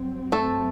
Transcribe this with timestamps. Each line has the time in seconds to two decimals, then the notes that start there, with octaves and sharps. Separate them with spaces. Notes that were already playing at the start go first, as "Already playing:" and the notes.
Already playing: G2 F#3 C4
0.32 A3 A4